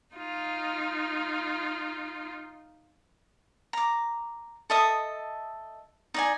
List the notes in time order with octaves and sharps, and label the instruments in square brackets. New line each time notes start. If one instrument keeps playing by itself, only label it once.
[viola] D#4 F4
[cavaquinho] A#5 D6
A4 D#5 E5 D#6
D#4 D5 G#5